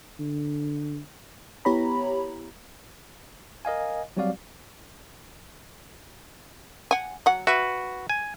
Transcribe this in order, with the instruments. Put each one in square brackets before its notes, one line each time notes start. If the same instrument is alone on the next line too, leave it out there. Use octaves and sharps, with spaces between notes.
[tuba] D3
[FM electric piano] B3 E4 G4 C#5 A#5 B5
[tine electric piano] A#4 D#5 F5 G#5
F#3 G3 C4 F#4 D5 F5
[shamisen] F#5 G#5
F#3 F#5
[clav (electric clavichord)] F#4 B4 [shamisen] E5
[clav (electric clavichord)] G#5